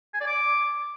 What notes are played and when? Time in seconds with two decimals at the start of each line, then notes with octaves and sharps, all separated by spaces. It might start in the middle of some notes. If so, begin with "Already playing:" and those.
0.14 G#5
0.20 D5
0.27 D6